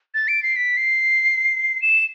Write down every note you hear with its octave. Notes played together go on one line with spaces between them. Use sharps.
A6
D7
C7
B6
C7
E7